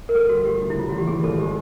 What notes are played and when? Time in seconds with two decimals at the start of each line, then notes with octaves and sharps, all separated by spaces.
0.09 A#4
0.15 F3 A4
0.29 G1 F#4
0.45 A3 G4
0.61 D2
0.70 E4
0.76 C#3 F4
0.89 E2 F#4
0.98 G4
1.07 E3 G#4
1.23 G#1 A4
1.38 G#3 G4